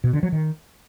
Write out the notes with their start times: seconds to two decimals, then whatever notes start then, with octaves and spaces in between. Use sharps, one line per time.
0.04 B2
0.13 D3
0.23 F#3
0.32 D#3